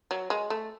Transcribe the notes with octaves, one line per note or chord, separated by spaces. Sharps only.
F#3
G#3
A3